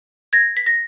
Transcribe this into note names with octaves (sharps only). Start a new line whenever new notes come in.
G#6 A#6
B6
A#6